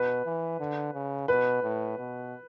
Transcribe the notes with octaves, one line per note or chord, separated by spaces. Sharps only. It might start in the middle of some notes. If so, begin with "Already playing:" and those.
Already playing: B2 B4
E3
D3
C#3
B2 B4
A2
B2